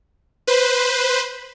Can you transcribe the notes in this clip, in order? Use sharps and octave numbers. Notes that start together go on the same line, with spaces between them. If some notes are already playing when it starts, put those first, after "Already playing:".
B4 C5